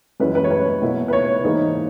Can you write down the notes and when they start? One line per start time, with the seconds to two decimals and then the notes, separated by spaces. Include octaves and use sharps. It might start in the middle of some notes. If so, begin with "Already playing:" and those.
0.20 F#2 E3 G#3 C#4 E4 B4
0.35 B4
0.44 C#5
0.51 B4
0.82 B2 A#3 E4
1.08 B4
1.13 C#5
1.44 G#2 E3 A#3 D#4